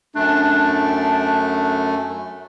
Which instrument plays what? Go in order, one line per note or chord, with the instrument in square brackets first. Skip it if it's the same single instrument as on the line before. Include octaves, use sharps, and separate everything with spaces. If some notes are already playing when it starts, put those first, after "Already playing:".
[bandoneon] F#2 A3 [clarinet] D4